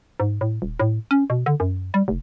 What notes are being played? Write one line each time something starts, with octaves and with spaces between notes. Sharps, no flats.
G#2
A2
D#1
A2
C#4
B2
D3
F#2
G3
F1